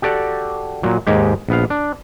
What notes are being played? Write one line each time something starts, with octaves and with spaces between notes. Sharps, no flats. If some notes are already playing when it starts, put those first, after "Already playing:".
F#4 G4 A4 D5 F#5
A#2 F#3
D#2 G#2 G#3 G4
A#1 B3 F5
D4